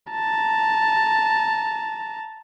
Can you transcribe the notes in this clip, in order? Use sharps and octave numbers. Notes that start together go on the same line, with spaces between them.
A5 A#5